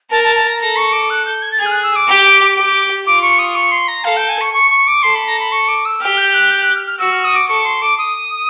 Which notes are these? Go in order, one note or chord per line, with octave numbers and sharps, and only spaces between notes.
A#4 A5
A5
A5
A#5
A4 A#5
C#6
D6
F#6
G6
G#6
A6
G#4 G#6
F6
F#6
E6
D6
G4
G4
F4 D6
C#6
D#6
C#6
C6
A#5
A4 F5
G5
G#5
C#6
C#6
C#6
D6
A4 C6
B5
A#5
B5
C#6
D6
E6
G4 F6
G6
F#6
G6
F#6
F6
F6
F#4 E6
F6
D#6
D6
A4 C#6
C6
D6
D#6